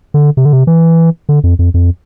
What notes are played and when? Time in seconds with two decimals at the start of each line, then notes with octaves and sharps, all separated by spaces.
0.14 D3
0.37 C3
0.45 D3
0.53 C3
0.67 E3
1.29 D3
1.44 F2
1.59 F2
1.74 F2